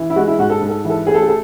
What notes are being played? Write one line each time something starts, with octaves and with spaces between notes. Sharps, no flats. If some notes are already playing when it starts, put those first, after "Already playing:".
Already playing: E3
E4
G#3 F#4
E4
G#2 F#4
A4
G#2
A4
E3 A4
A3 G#4
A4
G#4
A4